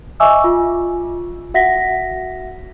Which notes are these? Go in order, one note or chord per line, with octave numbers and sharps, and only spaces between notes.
D#5 E5 G#5 C#6 D6 E6
F4
F#4 E5 F#5 A#6 B6